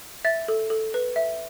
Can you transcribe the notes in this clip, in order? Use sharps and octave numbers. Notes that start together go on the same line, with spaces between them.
E5 A6
A4
A4
B4
E5